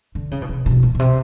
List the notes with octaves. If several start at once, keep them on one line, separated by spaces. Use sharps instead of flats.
D3
C#3
B2
C3
B2
B2
B2
C3